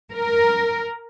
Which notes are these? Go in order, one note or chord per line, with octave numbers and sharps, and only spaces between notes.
A#4